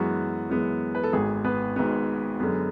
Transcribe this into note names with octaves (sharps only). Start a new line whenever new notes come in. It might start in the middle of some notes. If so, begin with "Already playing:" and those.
Already playing: F#2 E3 G#3 B3 F#4
F#2 E3 G#3 B3
B4
A4
G#1 G#2 G#3 B3 G#4
B3 B4
G#1 G#2 G#3 B3
F#2 D3 G#3 B3